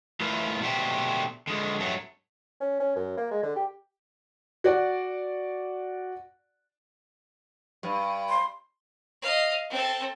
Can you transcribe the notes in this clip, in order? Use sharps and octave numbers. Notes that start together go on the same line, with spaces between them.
A3 E4 F4 A#4 B4
B2 D3 A3 G4 C5
D3 G#3
G2 F#3 A3
C#4
C#4
F#2
A#3
G#3
D3
G4
F#4 D5 F#5
G2
C6
D#5 F5
C4 A4